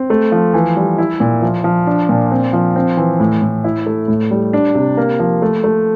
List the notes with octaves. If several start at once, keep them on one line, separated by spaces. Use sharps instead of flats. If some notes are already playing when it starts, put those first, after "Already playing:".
Already playing: C4
A3
F3
E3
G3
E4
A#2
F3
F3
D4
A#2
C4
F3
C4
E3
A2
A2
E4
A3
A2
G3
D4
C3
A#3
F3
A3
A3